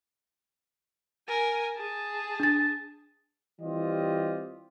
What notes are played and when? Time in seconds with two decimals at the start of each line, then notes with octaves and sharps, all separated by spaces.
1.28 A#4 G#5
1.76 G#4 A5
2.40 D4 A6
3.60 E3 G3 C4 F4 G4 D#5